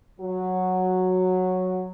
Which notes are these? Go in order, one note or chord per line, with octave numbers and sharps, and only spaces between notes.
F#3 F#4